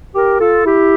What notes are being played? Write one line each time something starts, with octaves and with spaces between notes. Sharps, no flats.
G4 A#4
F4 A4
E4 G4